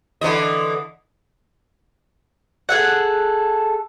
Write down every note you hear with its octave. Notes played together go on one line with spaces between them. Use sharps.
D3 E3 D#5
G#4 A4 F#5